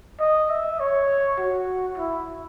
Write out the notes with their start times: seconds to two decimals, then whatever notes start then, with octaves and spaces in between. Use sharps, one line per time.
0.20 D#5
0.50 E5
0.80 C#5
1.38 F#4
1.98 E4